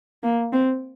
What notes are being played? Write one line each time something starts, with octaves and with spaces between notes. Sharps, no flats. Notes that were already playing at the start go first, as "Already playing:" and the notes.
A#3
C4